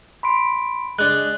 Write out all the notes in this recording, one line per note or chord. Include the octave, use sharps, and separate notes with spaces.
B5 C6 D7
G#3 D4 F#6